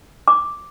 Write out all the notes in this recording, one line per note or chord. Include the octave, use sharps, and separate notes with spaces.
D6